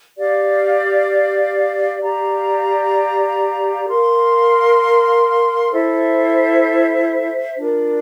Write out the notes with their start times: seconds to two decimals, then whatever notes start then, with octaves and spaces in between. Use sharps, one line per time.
0.16 G4 D5 F5
2.01 G4 D5 F5 A#5
3.87 A#4 F5 C6
5.71 E4 A4 C5 E5
7.57 D4 F4 A#4